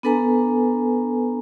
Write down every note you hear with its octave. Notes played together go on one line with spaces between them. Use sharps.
B3 D4 A4 B4 G#5 A#5